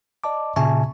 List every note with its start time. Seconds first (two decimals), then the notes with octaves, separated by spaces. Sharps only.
0.24 D5 D#5 A5 D6
0.56 A#2 C#3 E5 G#5 A5 C#6